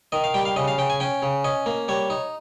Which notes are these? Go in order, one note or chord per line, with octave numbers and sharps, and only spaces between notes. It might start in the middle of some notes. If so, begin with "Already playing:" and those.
D#3 D#5
F5
G3 G5
F5
C#3 D#5
F5
C#3 G5
G#5
C#4 G5
C#3
C#4 D#5
A#3
G3 C#5
D#4